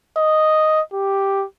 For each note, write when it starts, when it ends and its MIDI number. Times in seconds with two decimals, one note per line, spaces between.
0.17 0.81 75
0.93 1.45 67